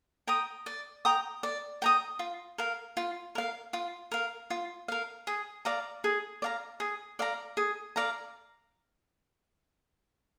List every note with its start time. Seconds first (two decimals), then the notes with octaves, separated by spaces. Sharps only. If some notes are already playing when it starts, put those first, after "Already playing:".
0.27 G5 A#5 D#6
0.66 D5
1.05 G5 A#5 D#6
1.43 D5
1.82 G5 A#5 D#6
2.19 F4
2.58 A#4 F5
2.97 F4
3.35 A#4 F5
3.73 F4
4.12 A#4 F5
4.50 F4
4.88 A#4 F5
5.27 G#4
5.65 D5 F5 A#5
6.04 G#4
6.42 D5 F5 A#5
6.80 G#4
7.19 D5 F5 A#5
7.57 G#4
7.96 D5 F5 A#5